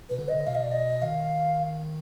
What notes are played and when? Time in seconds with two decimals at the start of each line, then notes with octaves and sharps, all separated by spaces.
0.09 B2 B4
0.19 D3
0.29 D#5
0.35 D3
0.47 B2 F5
0.55 D#5
0.63 D5
0.71 D#5
1.02 D#3 F5